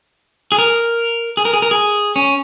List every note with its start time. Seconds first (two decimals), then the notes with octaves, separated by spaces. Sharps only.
0.52 G#4
0.58 A#4
1.37 G#4
1.45 A#4
1.53 G#4
1.62 A#4
1.71 G#4
2.16 C#4